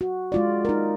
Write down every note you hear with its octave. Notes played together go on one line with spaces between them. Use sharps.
F#4
G#3 F4 D5
D#4 A#4